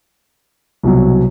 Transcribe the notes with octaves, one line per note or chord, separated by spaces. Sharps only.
C2 B2 F#3